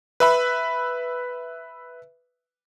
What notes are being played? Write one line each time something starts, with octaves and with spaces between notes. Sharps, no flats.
B4 E5 B5